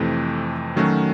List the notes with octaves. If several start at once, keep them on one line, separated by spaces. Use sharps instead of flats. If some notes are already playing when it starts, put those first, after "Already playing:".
Already playing: F2 C3 E3 A3
D#3 F#3 A3 C#4 F#4